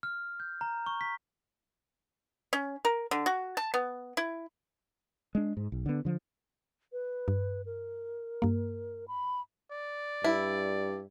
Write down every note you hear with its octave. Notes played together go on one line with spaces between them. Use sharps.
F6
G6
A#5
C#6
B6
C#4
A#4
D3
F#4
A5
B3
E4
G#3 D4
G#2
B1
D3 B3
D3 F3
B4
G2
A#4
G2 A#3
B5
D5
G2 E4